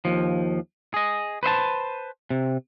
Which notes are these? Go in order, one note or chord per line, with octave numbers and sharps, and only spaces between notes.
D#2 F3
G#4 D#5
B4 C5 E5 A5
C3